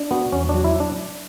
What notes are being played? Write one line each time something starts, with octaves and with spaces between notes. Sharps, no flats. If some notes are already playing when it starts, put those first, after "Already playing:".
Already playing: D4
B3 F#4
E2 C#4
D4
F#3
E4
D4